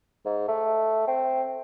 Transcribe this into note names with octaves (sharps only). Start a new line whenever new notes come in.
G#2
A3
C4